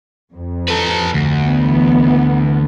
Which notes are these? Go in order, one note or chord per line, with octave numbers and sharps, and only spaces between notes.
F2
A4 B4
D2
E3 B3